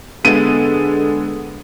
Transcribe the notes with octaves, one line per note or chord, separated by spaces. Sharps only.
D3 G#3 B3 A4 D#7